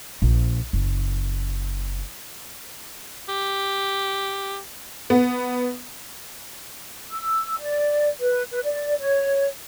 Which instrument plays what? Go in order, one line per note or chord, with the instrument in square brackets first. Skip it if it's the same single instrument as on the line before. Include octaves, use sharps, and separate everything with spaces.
[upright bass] A#1
F#1
[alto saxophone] G4
[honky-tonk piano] B3
[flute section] E6
D5
B4
B4
D5
C#5